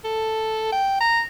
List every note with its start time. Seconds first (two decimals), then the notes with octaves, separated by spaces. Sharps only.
0.04 A4
0.72 G5
1.01 A#5